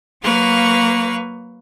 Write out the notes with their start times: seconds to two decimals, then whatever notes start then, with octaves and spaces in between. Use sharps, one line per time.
0.24 F#3 A#3 B4 F5 C#6